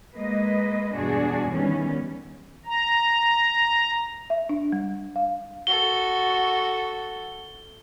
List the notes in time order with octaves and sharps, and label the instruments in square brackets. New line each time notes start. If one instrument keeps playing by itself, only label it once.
[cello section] G#3 A#3 B4 D#5
E2 G2 B2 D4 F#4 G#4
D#3 E3 G3 B3 C#4
[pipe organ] A#5
[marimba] E5
D4
G3
F5
[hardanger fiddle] F#4 A4 [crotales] G7